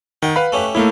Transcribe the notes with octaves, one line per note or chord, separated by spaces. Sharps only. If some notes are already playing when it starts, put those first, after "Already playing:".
D#3 F#5 G5
B4 F5 B5
A3 C#4 G4
A2 A3 A#3 D#4 E4